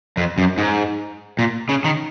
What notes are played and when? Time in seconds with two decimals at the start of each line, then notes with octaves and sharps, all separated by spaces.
0.17 F2
0.38 F#2
0.58 G#2
1.39 A#2
1.69 C#3
1.84 D#3